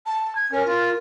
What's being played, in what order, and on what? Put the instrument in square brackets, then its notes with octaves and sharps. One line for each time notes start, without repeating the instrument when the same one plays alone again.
[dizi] A5
G#6
[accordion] C#4 [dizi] A#4
[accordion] F4